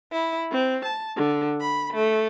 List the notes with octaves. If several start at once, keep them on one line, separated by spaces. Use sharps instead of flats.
E4
C4
A5
D3
B5
A3